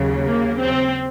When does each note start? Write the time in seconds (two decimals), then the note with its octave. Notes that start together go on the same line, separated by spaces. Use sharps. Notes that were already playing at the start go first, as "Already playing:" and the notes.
Already playing: D#2 C#3 F#3
0.25 A#3
0.60 C4